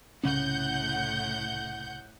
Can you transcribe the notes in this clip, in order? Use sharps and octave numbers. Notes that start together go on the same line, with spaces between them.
C2 A2 C#3 C#4 F#5 G6